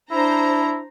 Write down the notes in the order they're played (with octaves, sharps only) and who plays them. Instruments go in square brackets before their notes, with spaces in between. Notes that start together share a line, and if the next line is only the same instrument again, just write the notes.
[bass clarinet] D4 [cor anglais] E4 [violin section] C5 A#5